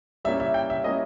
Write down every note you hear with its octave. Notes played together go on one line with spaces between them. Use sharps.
G3 A#3 C#4 E4 E5
E5
G5
E5
G3 A#3 C#4 E4 D#5